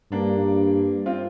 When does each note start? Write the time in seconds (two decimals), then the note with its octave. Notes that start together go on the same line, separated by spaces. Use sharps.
0.12 G2 A#3 D4
1.06 C4 F4